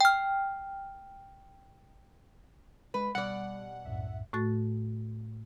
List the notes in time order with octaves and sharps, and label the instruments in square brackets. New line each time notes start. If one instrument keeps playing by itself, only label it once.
[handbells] G5 F6
[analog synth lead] G#3 [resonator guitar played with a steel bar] B4
[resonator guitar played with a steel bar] B2 D5 [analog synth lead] G3 [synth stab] F#5
[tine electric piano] C2 F#2 A2 [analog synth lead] E5
[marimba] A2 A3 F#4 A6